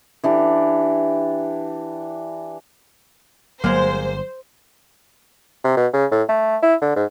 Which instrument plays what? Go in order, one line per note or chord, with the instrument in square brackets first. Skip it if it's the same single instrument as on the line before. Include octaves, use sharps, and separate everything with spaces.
[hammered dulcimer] E3 D4 G4
[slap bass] G1 [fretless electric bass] F#3 [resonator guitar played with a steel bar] G#3 A#3 [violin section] C5
[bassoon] C3
B2
C#3
A2
A3
E4
D3
G#2